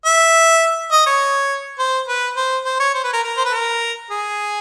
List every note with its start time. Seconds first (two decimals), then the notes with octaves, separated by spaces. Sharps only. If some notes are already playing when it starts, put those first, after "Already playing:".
0.05 E5
0.92 D#5
1.06 C#5
1.79 C5
2.08 B4
2.36 C5
2.65 C5
2.80 C#5
2.94 C5
3.04 B4
3.13 A#4
3.24 A#4
3.37 C5
3.45 B4
3.52 A#4
4.10 G#4